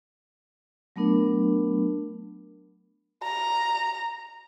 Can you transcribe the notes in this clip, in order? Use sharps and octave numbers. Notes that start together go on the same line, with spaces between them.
F#3 A3 B3 D4 A#4
A#5